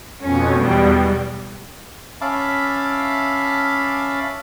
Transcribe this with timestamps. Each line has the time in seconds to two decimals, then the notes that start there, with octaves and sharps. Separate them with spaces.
0.24 F2 B2 C#4
0.58 E2 B2 G3
2.21 C#4 E5 F5 A5 B5 D6